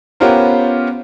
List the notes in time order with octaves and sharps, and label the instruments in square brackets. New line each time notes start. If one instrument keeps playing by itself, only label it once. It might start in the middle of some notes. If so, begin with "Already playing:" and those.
[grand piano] B3 C#4 F4 G4 A#4 C5